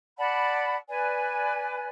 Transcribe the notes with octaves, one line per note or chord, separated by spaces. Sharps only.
D5 F#5 A5 B5
B4 D5 G#5